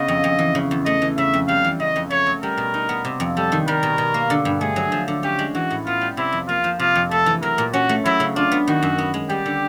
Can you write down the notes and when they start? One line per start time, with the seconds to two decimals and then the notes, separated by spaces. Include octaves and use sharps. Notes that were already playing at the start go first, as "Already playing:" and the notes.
Already playing: C#3 B3 D#5
0.08 F2
0.24 F2
0.39 E3
0.55 C#3
0.71 E2
0.85 A3 D#5
1.02 E3
1.18 C#3 E5
1.34 F2
1.48 G3 F5
1.64 E3
1.80 C#3 D#5
1.96 F2
2.10 A3 C#5
2.26 F#3
2.42 G3 A#4
2.57 B2
2.74 D#4
2.89 B3
3.05 C3
3.20 F2
3.36 G3 A4
3.52 D#3
3.68 G3 A#4
3.83 B2
3.98 B2
4.14 A#3
4.30 D3
4.45 G2
4.60 A3 G#4
4.76 F#3
4.92 F3
5.08 D3
5.23 C#4 G4
5.39 G#3
5.55 E3 F#4
5.70 A2
5.86 B3 F4
6.01 G3
6.17 C3 E4
6.32 F2
6.48 A#3 F4
6.64 F3
6.79 C3 F4
6.95 F2
7.11 A3 A4
7.26 E3
7.42 F#3 A#4
7.58 A#2
7.73 C#4 F#4
7.89 A3
8.05 F#3 E4
8.20 C#3
8.36 D4 F4
8.52 B3
8.67 D#3 F#4
8.82 F#2
8.98 B3
9.14 G#3
9.29 G3 G4
9.46 D3